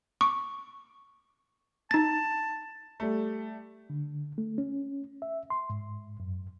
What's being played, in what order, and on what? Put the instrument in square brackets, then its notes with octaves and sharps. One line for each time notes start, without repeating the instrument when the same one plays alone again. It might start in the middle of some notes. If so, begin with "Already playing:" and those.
[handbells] C#6 D6
[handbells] D#4 A6 [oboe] A5
[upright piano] G3 A3
[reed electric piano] D3
A3
C#4
E5
C6
G#2
F#2